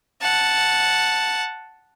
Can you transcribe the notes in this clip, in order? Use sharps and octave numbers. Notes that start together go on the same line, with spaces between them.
F#5 A5